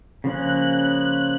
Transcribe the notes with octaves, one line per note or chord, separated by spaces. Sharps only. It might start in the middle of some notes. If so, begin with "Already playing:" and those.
C#3 F3 A#3 C#4 F#6
F#6